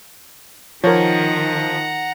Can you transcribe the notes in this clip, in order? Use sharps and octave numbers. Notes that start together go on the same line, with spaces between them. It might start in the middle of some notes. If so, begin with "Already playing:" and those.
D#3 F3 A#4 C#5 F#5 A#5